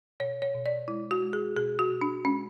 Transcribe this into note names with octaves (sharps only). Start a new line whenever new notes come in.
B2 C#5
C#5
B2
D5
G#3 E4
F#4
G#3
G#4
B2 G#4
F#4
B2
D4
G#3 C#4